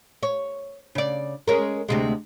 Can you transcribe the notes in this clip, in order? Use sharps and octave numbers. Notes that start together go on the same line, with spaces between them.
C#5
C#3 D5
G#3 C#4 A#4
D2 C3 G#3